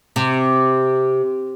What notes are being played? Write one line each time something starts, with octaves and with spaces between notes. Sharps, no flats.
C3